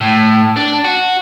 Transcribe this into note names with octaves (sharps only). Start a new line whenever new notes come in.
A2
D4
F#4